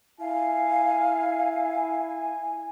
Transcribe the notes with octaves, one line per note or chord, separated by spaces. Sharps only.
E4 F5 G#5